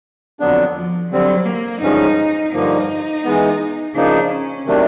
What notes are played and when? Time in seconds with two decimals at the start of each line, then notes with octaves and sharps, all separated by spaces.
0.40 F2 D3 F#3 B3 D4
0.75 F3
1.11 D3 F#3 G3 C4
1.46 A#3
1.81 G2 D3 F3 G#3 C#4 D#4
2.53 G2 D3 F3 A#3 D#4
3.24 E3 G#3 B3
3.95 C#3 F3 A#3 D4 D#4
4.30 C#4
4.66 C3 D#3 F#3 A3 D4